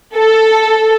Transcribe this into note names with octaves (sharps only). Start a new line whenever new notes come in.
A4